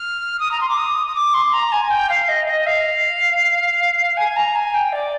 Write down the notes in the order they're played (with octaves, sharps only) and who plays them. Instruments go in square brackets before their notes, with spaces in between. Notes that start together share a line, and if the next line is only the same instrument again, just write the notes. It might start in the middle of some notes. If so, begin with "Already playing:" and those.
Already playing: [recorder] F6
D#6
A#5
C6
D6
D#6
D#6
D6
C6
A#5
G#5
G5
F5
D#5
D#5
F5
G#5
A#5
G#5
G5
D5